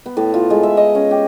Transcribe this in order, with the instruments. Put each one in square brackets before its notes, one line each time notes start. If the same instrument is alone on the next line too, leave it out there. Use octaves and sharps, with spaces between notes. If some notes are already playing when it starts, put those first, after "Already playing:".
[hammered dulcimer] B3
A2
F4
G#3
E5
D#5
C#4
G4